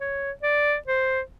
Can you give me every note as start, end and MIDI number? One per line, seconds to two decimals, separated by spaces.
0.01 0.31 73
0.43 0.76 74
0.88 1.21 72